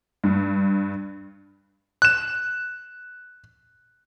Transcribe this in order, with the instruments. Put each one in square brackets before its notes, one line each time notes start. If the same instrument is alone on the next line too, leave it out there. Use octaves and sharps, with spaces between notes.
[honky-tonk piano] G2
[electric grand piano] F#6 E7